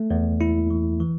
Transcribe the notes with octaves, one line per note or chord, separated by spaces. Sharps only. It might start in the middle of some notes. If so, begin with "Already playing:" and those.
Already playing: A3
E2
E4
E3
E3